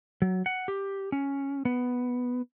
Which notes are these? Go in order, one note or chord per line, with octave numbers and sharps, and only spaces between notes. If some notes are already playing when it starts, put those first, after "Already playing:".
F#3
F#5
G4
C#4
B3